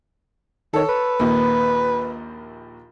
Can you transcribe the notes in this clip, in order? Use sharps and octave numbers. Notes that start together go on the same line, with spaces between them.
D#3 A4 C#5
B4
A#1 D#2